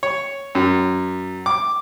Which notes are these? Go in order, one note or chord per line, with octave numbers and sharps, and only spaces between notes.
C#5
F#2
D6